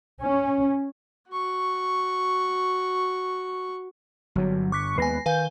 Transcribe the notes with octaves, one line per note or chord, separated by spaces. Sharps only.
C#4
F#4 C#6
G1 G2 F#3
C#6 D6 F#6 B6
D#2 G#3 B3 B4 G#5 A#6 C7
D#3 B4 F5 G#5 G6